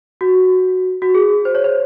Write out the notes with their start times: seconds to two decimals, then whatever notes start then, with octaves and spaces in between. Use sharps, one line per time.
0.21 F#4
1.02 F#4
1.14 G#4
1.45 C5
1.55 C#5
1.64 C5